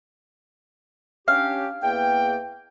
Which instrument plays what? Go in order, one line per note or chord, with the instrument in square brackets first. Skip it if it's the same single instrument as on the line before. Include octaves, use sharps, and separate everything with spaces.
[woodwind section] C#4 D4 G4 [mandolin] F5
[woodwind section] E2 A#3 G5